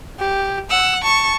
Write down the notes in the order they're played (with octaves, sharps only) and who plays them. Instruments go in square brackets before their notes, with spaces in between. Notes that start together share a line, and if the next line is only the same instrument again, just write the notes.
[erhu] G4
[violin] F#5 [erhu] E6
[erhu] A5 [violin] C#6